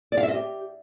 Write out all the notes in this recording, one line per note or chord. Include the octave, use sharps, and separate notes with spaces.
D5
F5
E5
D#5
G4